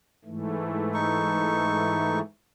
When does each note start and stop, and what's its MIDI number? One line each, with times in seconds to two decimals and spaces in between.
0.25 2.21 44
0.25 2.21 52
0.25 2.21 57
0.94 2.19 63
0.94 2.19 85